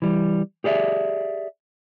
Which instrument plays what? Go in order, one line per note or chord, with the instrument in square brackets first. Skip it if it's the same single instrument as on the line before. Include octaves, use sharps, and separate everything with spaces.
[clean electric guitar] E3 G3
G4 G#4 D5 E5